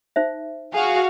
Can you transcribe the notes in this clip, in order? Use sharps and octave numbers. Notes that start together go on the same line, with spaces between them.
D#4 C5 E5
F#4 G#4 F5